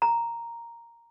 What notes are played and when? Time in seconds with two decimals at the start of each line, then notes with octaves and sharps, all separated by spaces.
0.02 A#5